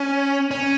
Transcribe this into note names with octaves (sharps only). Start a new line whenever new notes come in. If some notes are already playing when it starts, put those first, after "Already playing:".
Already playing: C#4
C#4